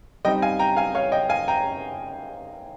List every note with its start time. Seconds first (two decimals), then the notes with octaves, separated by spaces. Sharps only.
0.25 G3 C4 D#4 D#5 G5
0.42 F5 G#5
0.59 G5 A#5
0.77 F5 G#5
0.95 C#5 F5
1.12 D#5 G5
1.29 F5 G#5
1.48 G5 A#5